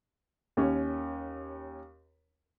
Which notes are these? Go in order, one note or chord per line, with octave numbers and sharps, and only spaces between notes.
D#2 C#4